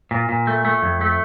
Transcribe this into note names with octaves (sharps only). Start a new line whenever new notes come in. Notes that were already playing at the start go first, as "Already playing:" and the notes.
A#2
A#2
A3
A3
F2
A3